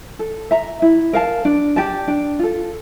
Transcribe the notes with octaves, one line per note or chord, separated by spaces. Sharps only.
A4
E5 A#5
E4
A#4 F5 A5
D4
G4 D5 A5
D4
F4 A4